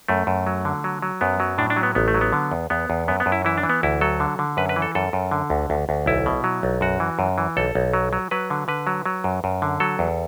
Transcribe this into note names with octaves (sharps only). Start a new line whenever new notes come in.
F#2 A3
F#2
F#3
D3
F#3
F#3
F#2 B3
F#3
A2 D4
D4
F#3
B3
A1 B3
A3
F#3
B3
D3
E2
E2 B3
E2
F#2 B3
B3
F#2
E4
E3 E4
D4
E3
B3
D2 E4
F#3 A4
D3
D3
F#2 B4
B4
E3
A4
F#2 A4
F#2
D3
D2
D2
D2
B1 E4
B2
F#3
B1
F#2 F#4
E3
F#2
E3
B1 A4
B1
F#3
F#3
F#3 B4
D3
D3 B4
F#3
F#3
F#2
F#2
D3
F#3 A4
E2